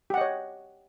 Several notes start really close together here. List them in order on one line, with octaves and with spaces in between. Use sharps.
G4 F#5 D#5 C#5